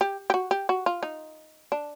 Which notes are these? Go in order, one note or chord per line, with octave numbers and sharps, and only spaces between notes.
G4
G4
F#4
G4
F#4
F4
D#4
D4